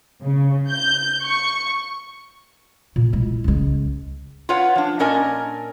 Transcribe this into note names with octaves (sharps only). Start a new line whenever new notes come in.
C#3
G6
C#6
A#2
G#3 E4
C#2 G#3
F4 B4 C#5 F#5
F3 D4
A#2 C#4 D4 A#4 D#5 G#5